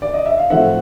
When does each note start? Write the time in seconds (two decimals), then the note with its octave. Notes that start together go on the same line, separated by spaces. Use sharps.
0.02 D5
0.14 D#5
0.26 E5
0.38 F5
0.50 A2 F3 A3 C4 E5 F#5